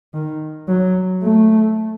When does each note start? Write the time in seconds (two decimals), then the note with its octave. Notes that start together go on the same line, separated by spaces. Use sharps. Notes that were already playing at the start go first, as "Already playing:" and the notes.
0.14 D#3
0.68 F#3
1.23 A3